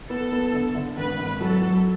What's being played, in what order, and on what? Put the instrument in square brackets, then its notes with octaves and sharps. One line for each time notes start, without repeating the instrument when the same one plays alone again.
[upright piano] B3 [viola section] A4
[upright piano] B3
D3
D3
[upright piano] G#1 [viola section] B4
[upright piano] G#1
[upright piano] F#3 [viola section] A4
[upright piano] F#3